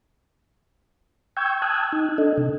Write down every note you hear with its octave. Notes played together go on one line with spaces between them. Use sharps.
G5 C#6 E6 G6 G#6
G5 A5 D#6 E6 F#6 G#6
D#4
D4 A4 D#5
C3